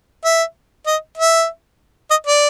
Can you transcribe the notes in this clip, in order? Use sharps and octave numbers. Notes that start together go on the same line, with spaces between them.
E5
D#5
E5
D#5
D5